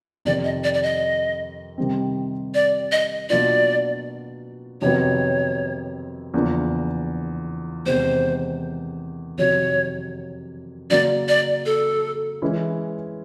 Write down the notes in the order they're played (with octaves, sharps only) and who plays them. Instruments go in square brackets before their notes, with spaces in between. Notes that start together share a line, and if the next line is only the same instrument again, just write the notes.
[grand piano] F2 C3 D#3 [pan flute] D5
[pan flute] D#5
D5
D5
D#5
[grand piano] C3 D#3 G3 C4
[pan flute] D5
D#5
[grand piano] B2 F#3 A#3 D4 F4 [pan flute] D5
[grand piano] F2 C3 D#3 F#3 B3 [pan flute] C#5
[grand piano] E2 C#3 F3 A#3 D4
[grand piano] E2 C3 D#3 G#3 [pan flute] C5
[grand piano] F2 C3 D#3 F#3 [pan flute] C#5
[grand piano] C#3 F#3 A#3 [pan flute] D5
[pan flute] D5
A4
[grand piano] E3 G#3 C#4 E4